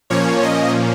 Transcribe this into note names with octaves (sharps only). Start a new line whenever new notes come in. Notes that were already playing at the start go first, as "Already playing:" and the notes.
A#2 F3 A#3 C#4 C#5
D#5